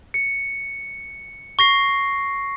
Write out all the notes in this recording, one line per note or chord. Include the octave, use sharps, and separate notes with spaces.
C#7
C#6 A#6 C7